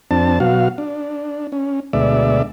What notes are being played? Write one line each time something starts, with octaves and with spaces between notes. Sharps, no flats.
F2 C4 D4 A5
B2 F#3 F#4 F5
D4
C#4
D2 B2 G#3 D5 E5